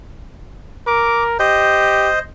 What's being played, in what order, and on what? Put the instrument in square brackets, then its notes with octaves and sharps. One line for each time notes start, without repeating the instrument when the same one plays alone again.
[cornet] A#4 [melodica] D6
[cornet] G4 [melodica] C5 D#5